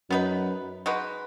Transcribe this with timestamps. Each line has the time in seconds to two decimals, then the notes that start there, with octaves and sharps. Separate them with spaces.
0.10 F#2 B3 D#4 B4
0.86 G#3 D#4 F#4 B4